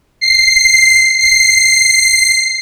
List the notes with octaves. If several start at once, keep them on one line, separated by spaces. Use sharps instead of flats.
C7
C7